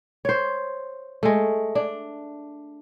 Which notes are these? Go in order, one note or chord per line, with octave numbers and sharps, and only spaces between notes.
C5 C#5
G#3 A3
D4